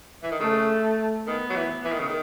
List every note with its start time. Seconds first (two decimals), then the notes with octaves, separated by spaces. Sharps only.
0.23 E3
0.32 D#3
0.40 C#3 A3
1.27 D#3 B3
1.50 F#3
1.56 E3
1.85 E3
1.92 D#3
1.99 C#3
2.07 D#3